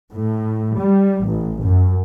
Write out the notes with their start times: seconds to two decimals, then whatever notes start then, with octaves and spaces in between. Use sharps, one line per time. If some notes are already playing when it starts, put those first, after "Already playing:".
0.13 A2
0.79 G3
1.25 A1
1.65 F#2